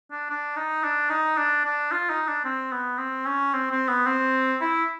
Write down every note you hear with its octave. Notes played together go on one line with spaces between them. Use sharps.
D4
D4
D#4
D4
D#4
D4
D4
F4
D#4
D4
C4
B3
C4
C#4
C4
C4
B3
C4
E4